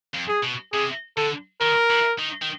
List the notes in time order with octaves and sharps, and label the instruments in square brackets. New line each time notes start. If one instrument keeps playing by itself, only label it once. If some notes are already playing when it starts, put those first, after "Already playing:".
[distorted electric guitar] F2
[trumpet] G#4
[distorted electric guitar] B2
[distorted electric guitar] C3 [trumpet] G#4
[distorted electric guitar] D3 [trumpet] A4
[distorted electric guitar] D#3 [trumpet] A#4
[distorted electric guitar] E3
D#3
D#3